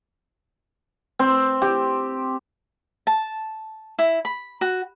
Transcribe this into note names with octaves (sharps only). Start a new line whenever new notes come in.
C4
G4
A5
E4
B5
F#4